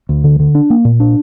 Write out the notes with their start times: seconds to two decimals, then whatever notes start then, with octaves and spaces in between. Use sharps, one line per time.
0.09 D2
0.24 D3
0.40 D3
0.55 D4
0.70 A#3
0.85 A#2
1.00 D4